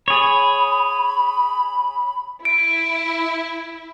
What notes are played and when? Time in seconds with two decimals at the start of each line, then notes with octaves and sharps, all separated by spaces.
0.08 G#4 C#5 B5
2.45 E4 D7